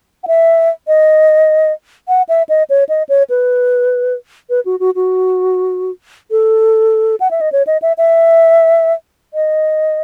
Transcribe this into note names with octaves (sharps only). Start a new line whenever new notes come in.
F#5
E5
D#5
F#5
E5
D#5
C#5
D#5
C#5
B4
B4
F#4
F#4
F#4
A4
F#5
E5
D#5
C#5
D#5
E5
E5
D#5